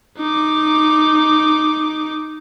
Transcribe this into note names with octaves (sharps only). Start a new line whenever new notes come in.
D#4 D6